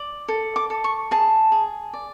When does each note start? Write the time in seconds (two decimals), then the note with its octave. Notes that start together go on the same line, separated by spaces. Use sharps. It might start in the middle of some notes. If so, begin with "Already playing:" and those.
Already playing: D5
0.28 A4
0.56 D6
0.70 A4
0.84 C#6
1.11 G#4 A5
1.52 G#4
1.93 D5